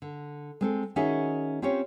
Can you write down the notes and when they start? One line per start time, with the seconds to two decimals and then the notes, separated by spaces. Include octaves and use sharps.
0.02 D3
0.61 G#3 C4 A4
0.96 D#3 C#4 D#4 F#4 G#4 E5
1.62 C4 C#4 F4 G4 C5 C#5